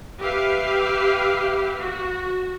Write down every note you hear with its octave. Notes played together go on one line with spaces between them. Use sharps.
G4 B4 E5 F5
F#4